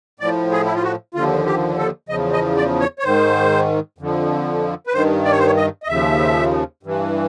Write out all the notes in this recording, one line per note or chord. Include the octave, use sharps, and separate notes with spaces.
A2 F3 D5
G#4
E4
F4
F#4
D#2 D3 F3 F4
G4
A4
E2 C#3 F3 D#5
D#5
D5
C#5
C#5
G#2 D#3 C5
F2 D3 F3
B4
G2 D#3 C5
D5
C#5
C5
C#5
D#5
D#5
D#2 C#3 F3 E5
G2 E3